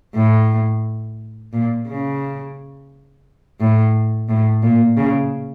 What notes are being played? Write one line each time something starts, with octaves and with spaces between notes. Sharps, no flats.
A2
A#2
C#3
A2
A2
A#2
C#3